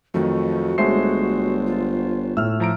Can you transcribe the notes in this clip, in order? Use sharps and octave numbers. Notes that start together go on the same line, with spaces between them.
F2 D#3 F#3 A3 F#4
G1 G#3 A3 C5 C#5 F#5 C7
F4
A2 E6 F6
F3 A#5 D7